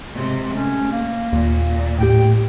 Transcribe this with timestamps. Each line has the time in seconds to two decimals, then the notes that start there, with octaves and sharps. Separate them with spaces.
0.15 G#2 C3
0.53 A3 C#4
0.92 A#3
1.33 D#2 A#2
1.99 A2 G4 G5